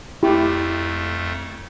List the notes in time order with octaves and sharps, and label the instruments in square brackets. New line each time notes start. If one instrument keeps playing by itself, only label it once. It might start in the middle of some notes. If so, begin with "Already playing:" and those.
[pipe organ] F2 A3 [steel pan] E4 G4